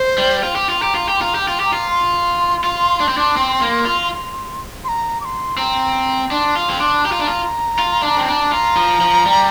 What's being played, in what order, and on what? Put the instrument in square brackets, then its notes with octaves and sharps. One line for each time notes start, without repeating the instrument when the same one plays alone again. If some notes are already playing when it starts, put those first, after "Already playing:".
Already playing: [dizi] C5
[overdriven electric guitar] G3
[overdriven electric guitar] F4 [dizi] G5
[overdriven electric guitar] G4
F4
[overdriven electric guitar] G4 [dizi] A#5
[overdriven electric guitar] F4
G4
[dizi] C6
[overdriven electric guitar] F4 [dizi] A#5
[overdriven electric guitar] G4
[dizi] G5
[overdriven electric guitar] F4
G4
[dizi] A#5
[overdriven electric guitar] F4
[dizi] C6
[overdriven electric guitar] F4
D4
C4
D4
C4
A#3
F4
[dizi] C6
A#5
D6
C6
[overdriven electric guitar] C4 [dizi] A#5
[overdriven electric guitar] D4 [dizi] C6
[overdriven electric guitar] F4
C4
D4
[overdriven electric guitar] G4 [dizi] A#5
[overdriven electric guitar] F4
D4
F4
F4
D4
C4
D4
[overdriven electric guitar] F4 [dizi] A#5
[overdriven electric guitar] F3
F3
G3